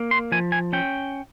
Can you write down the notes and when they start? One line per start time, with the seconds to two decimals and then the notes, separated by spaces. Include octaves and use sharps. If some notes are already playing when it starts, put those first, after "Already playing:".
Already playing: A#3
0.11 C6
0.32 F3 G#5
0.52 G#5
0.73 C#4 G5